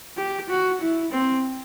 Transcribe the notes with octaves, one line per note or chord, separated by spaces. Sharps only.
G4
F#4
E4
C4